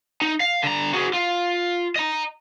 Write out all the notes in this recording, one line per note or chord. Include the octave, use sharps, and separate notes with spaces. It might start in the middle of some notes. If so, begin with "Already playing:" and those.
D#4
F5
D3 A#5
F#4 G#4
F4
D#5 A#5